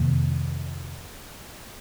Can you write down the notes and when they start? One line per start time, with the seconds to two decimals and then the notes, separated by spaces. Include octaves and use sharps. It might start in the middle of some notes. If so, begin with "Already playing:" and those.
Already playing: F2 C3 D#3 A#3